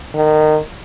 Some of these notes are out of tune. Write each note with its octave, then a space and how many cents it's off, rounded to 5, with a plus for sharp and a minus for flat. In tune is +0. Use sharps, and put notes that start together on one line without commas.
D#3 -20